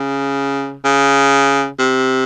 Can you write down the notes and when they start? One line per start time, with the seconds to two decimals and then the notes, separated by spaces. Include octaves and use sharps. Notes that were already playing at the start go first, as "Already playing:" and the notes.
Already playing: C#3
0.84 C#3
1.79 C3